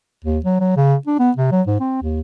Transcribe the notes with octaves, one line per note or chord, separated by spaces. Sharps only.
D#2
F#3
F#3
C#3
D4
B3
C3
F#3
G#2
C4
D#2